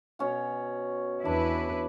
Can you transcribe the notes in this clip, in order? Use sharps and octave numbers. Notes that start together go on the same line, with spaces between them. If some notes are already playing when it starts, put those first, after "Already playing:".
B2 C#4 F#5
E2 D4 E4 B4